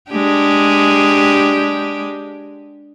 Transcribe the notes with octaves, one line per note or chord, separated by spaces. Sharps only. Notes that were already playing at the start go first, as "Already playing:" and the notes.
G#3 D4 G4